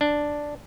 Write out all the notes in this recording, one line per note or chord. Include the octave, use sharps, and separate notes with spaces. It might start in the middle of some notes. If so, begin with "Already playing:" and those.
D4